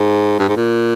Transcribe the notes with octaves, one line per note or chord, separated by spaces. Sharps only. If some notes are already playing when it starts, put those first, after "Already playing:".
Already playing: G#2
G2
G#2
A#2